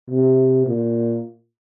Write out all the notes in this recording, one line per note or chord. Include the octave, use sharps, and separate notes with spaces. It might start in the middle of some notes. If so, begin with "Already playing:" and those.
C3
A#2